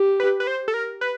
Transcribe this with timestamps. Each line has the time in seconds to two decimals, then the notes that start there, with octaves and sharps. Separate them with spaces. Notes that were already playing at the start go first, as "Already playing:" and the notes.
Already playing: G4
0.20 B4
0.40 B4
0.47 C5
0.68 A4
0.74 A#4
1.01 B4